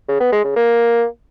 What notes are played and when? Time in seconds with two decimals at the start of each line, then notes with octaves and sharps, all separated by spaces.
0.08 C#3
0.20 B3
0.32 G#3
0.44 C#3
0.56 A#3